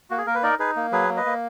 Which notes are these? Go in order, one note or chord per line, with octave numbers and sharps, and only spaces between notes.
A#3 F#4
G#4
A#3 A#4
B4
D#4 A#4 D5
D#4 G#4 B4
A#3
F#3 G#4 B4
A#3
B4 D#5
A#3